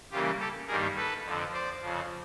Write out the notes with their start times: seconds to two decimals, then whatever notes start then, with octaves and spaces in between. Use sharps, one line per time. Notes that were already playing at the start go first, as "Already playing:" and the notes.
0.11 C#3 E3 G3 A#3 F4 G4
0.40 G4 A4
0.67 G2 D#3 G3 A#3 G#4 A#4
0.96 A4 B4
1.24 F2 D3 F3
1.52 C5 D5
1.81 F2 C#3 F3